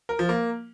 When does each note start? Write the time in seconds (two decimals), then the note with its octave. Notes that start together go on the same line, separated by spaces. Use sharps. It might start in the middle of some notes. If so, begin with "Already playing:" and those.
0.09 A#4
0.19 F3
0.29 A#3